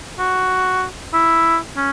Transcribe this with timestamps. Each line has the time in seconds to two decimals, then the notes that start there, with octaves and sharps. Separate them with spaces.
0.19 F#4
1.14 E4
1.76 C#4